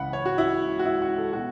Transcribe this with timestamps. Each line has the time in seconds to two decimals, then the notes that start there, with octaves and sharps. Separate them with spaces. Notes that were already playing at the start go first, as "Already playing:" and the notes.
Already playing: C#2 C#3 E3 F#5 B5
0.13 C#5
0.25 F#4
0.38 E4
0.79 F#4
0.85 E4
1.02 F#4
1.18 A4
1.33 B2 F#4